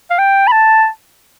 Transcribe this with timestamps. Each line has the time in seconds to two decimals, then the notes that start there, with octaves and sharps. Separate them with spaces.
0.10 F5
0.18 G5
0.48 B5
0.52 A5